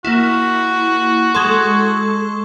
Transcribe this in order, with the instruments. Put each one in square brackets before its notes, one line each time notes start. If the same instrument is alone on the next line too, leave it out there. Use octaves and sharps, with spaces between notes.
[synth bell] A#3 E4 [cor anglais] F#4
[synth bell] G#3 A4 [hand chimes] C6 C#6 G#6